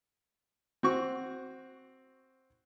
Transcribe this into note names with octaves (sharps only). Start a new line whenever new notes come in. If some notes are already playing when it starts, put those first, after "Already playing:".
C4 F#4 C#6